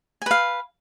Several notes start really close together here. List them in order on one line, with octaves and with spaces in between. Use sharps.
G#5 B4 F5